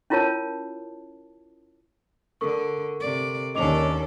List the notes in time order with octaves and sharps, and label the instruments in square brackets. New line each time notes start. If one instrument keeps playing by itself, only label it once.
[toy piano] C#4 E4 F4 A#4 C#5 A5
[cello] D3 [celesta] A4 A#4 C#6
[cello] C3 D5
[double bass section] D#2 D#3 C#4 [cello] D4 A4 [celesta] D#5 D6 F7